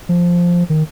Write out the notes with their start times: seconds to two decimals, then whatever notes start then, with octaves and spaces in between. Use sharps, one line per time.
0.09 F3
0.70 D#3